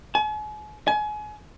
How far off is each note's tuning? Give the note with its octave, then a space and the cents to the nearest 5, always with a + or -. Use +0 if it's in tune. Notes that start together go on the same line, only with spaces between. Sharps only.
G#5 +40
G#5 +30